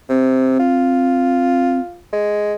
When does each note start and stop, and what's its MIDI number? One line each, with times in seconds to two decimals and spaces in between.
0.09 0.56 48
0.09 1.79 60
0.59 2.01 65
2.12 2.54 56